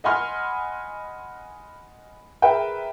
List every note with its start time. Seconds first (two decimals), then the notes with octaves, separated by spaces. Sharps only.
0.04 D#5 F#5 G#5 B5 C6 F6
2.42 G#4 A#4 B4 E5 G5